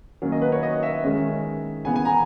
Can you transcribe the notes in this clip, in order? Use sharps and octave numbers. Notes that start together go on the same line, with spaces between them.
D#3 F#3 A#3 C#4
D#5
B4
C#5
D#5
E5
D#3 G#3 C#4
C#3 E3 B3 G#5
G#5
A#5